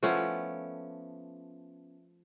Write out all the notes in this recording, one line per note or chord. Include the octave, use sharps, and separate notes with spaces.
F3 A3 B3 C#4